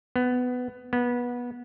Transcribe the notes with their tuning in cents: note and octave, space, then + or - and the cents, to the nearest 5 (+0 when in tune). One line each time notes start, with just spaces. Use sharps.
B3 +15
B3 -20